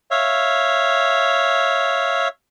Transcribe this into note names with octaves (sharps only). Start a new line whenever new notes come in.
C#5 E5 F5